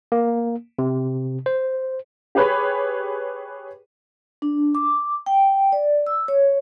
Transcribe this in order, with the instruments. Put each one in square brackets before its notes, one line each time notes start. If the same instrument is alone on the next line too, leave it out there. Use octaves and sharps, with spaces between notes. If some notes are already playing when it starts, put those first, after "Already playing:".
[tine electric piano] A#3
C3
C5
[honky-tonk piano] G4 G#4 B4 C#5 B5
[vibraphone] D4
D6
G5
D5
E6
C#5